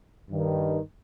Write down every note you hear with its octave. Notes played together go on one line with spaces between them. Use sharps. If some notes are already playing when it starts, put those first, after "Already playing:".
G2 D#3